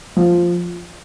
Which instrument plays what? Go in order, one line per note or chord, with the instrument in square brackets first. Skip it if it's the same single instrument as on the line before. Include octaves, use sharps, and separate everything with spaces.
[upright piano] F3